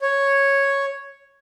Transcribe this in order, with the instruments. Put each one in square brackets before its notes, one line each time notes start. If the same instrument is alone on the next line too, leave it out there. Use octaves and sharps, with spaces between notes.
[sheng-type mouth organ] C#5